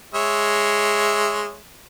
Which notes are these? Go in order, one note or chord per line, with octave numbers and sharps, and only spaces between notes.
G#3 C#5 E5